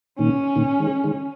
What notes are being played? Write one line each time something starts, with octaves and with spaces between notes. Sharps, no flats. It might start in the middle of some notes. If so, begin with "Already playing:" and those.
A#2 D#3 C#4
A#2 D#3
D#3 G#3
D#3 G#3